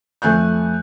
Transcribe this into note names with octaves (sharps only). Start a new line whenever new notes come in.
F2 A3 G#5 F#6 G6